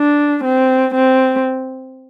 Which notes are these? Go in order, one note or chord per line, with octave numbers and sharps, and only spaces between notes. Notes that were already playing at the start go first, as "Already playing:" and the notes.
Already playing: D4
C4
C4